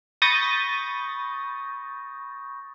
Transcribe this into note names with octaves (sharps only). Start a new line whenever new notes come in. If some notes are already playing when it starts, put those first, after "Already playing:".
B5 C#6 D#6 G6 A6 A#6